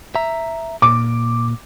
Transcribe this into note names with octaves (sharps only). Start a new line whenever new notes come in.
E5 A#5
A#2 D6